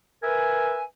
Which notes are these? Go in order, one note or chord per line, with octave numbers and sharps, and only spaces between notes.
A#4 B4 E5 G#5